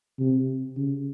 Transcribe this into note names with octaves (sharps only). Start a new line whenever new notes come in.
C3
C#3